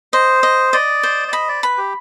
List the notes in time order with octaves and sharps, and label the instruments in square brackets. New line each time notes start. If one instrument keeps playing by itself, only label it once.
[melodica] C5 [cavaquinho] D#5
[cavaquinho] D#5
[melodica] D5 [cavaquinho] D#5
[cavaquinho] C5
[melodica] D5
[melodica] D#5 [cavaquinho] B5
[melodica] D5
[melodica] B4 [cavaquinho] B5
[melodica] G4